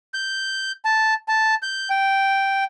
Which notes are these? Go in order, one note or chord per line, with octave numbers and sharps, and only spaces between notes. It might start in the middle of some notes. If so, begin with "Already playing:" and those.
G6
A5
A5
G6
G5